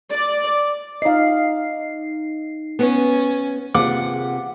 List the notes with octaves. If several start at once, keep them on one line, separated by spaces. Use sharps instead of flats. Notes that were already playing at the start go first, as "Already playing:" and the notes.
D5
D#4 D#5 F5 C7
B3 C#4
C3 A#3 F4 G#4 F#5 D6